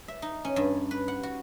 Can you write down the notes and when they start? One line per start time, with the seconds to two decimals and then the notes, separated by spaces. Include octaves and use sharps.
0.08 E5
0.22 D#4
0.45 C#4
0.56 G2
0.91 B4
1.08 F#5
1.23 F#4